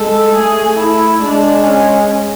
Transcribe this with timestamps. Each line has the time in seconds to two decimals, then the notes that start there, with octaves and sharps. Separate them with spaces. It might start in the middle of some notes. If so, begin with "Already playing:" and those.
Already playing: G#3 A4
0.35 A3 G#4
0.78 E4
1.22 G#3 D4
1.64 C#4